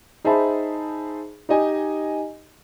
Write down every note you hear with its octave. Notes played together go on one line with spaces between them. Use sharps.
D#4 G#4 C5 E5 A5 B5
D#4 G4 D#5 G#5